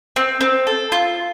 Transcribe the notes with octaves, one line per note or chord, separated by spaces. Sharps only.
C4
C4
A4
F4